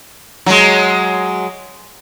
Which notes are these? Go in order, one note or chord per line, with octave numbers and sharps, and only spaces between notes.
F#3 G#3